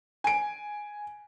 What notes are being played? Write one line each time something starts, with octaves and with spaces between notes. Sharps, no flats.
G#5 D7